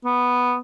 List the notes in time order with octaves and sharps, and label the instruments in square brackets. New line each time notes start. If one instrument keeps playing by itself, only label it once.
[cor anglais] B3